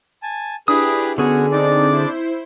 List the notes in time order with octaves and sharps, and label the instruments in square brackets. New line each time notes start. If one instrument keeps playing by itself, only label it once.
[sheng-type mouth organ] G#5 A5
[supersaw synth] D4 E4 G4 [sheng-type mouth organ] G#4 B4 [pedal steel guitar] D#6
[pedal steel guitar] D3 G#4 [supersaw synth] B3 [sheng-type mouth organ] C#4 F#4 C#5
[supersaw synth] C4 D#4 [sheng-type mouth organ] D4 D5
[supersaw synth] E4 C5